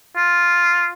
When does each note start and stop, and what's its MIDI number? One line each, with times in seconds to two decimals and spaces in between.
0.16 0.90 65